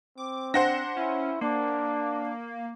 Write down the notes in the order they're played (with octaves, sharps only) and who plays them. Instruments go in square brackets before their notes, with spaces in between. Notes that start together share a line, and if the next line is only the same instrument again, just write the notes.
[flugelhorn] C4 [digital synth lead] D6
[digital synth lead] D4 [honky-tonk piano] C5 F#5 A#6
[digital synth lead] C#4 [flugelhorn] E4
[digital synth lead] A#3 [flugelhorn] D4